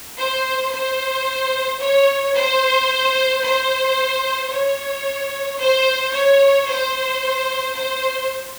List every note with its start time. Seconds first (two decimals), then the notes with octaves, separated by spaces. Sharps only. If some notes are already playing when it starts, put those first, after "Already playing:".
0.17 C5
0.71 C5
1.79 C#5
2.34 C5
3.43 C5
4.50 C#5
5.59 C5
6.13 C#5
6.68 C5
7.75 C5